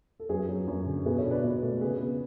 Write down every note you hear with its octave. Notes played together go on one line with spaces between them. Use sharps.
A4
F#2 G#4 B4
F#3
F#2
D3
B2 G#4 B4
A4 C#5
D4
B4 D5
B2
A3
C#3 G#4 B4
B3